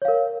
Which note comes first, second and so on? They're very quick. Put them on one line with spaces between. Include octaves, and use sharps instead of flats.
C#5 F5 A#4